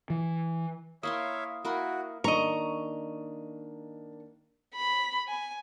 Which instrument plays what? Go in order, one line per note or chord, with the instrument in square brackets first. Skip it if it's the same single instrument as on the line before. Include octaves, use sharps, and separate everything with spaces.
[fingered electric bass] E3
[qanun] A#3 E4 C6 [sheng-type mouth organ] C#5 E5 F5 [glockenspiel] D#6
[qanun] A#3 E4 A#4 [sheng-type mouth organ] F#4
[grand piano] D#3 A#3 D4 [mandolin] D#5 C#6 [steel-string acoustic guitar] A#5
[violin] B5
G#5